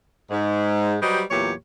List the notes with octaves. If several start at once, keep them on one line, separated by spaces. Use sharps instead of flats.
G#2
F#3 G3 G4 B4 C5 D#5
E2 A#2 E3 F#3 G4 C#5